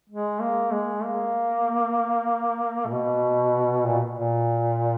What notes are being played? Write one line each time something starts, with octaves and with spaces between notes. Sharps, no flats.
G#3
A#3
G#3
A#3
A#2
B2
A#2
A#2